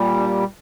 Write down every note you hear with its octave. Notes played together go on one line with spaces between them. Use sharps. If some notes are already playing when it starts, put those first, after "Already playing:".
Already playing: A#2 G3
D4